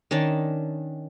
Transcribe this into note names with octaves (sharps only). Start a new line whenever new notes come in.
D#3 C#4 D4 A5